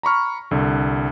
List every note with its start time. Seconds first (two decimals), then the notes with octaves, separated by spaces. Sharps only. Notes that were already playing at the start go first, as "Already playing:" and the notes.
0.03 A#5 B5 C#6 F6
0.51 C2 D3